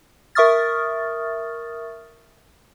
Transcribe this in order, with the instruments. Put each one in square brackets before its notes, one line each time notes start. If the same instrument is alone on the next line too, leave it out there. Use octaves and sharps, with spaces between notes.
[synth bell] A#4 E5 C#6 D#6 F6 A6